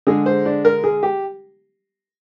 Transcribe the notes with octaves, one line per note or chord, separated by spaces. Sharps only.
D3 G#3 G#4
C5
D4
A#4
G#4
G4